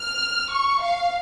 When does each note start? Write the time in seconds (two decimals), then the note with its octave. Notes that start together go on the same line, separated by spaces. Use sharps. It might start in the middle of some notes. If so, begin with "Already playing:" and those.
Already playing: F6
0.52 C#6
0.83 F5